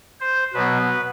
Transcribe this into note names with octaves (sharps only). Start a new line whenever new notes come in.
C5
B2 F#3 B3 B4